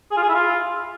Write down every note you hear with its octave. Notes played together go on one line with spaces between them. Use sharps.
G#4
F4
G#4
E4
F4